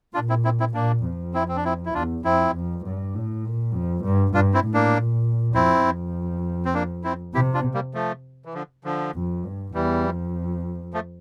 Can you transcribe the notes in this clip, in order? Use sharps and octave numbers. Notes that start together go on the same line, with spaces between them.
A#2 D4 F4
C4 E4
C4 E4
C4 E4
A#2 A#3 D4
F2
C4 E4
C4
D4
C4 E4
E4
E2 D4 F4
F2 C4 E4
F2
G2
A2
A#2
F2
G2
G2 D4 F4
C4 E4
A2
A#3 D4
A#2
F2 C4 E4
F2
C4
A#3 D4
C4 E4
C3 E4 G4
D4 F4
G3 A#3
F3 A3
E3
D3 F3
D3 F3
F2
G2
E2 E3 G3
F2
F3 A3